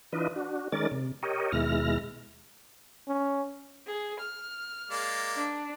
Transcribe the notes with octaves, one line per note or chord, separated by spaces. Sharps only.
E3 D4 F4 B4 D#5
D4 F#4
D#3 G#3 C#4 A#4 D5 A6
C3
G4 A#4 C#5 D#5
D#2 B2 G#3 E4 F6 A#6
C#4
G#4
F6
G#3 A#3 D5
D4